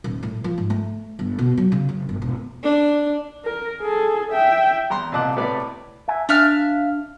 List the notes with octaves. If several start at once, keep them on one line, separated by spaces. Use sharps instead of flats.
D#1
A2
F3
G#2
A3
G1
B2
F#3
C#3
F#1
G1
E1
D4
A#4
G#4 A4
E5 G5
E2 A#5 C6
C2 A#2 D#5 A5 D6 F#6
A2 C3 B4 D5 B5 D6
E5 G#5
D4 E5 F5 F6